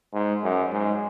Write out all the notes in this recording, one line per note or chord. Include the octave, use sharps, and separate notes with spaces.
G#2
F#2
G#2